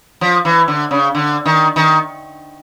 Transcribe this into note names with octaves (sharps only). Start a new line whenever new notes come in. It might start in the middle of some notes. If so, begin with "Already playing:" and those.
F3
E3
D3
C#3
D3
D#3
D#3